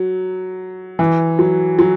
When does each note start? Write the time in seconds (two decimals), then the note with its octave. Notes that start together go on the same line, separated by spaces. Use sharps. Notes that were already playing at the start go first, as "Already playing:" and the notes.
Already playing: F#3
0.99 E3
1.39 F#3
1.79 F#3